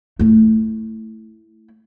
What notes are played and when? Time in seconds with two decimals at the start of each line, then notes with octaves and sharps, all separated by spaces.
0.19 A3 E4